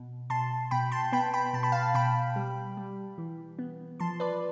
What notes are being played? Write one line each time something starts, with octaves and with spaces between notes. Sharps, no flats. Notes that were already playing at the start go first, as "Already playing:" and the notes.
Already playing: B2
B2 A5 C6
B2 G5 B5
A5 C6
B3 G5 B5
G5 B5
B2 A5
B5
F5 A5
B2 G5 B5
G3
G3
E3
B3
F3 A5 C6
B4 D5